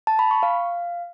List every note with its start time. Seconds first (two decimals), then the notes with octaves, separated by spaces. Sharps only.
0.07 A5
0.19 B5
0.31 C#6
0.43 F5